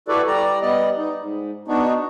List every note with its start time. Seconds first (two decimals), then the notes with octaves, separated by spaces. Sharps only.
0.08 E4 F#4 G4 A4 B4 D5
0.27 G3 D5 A#5
0.62 G3 B3 D5 D#5
0.97 D#4
1.18 G#2
1.68 B3 D4 D#4 F#4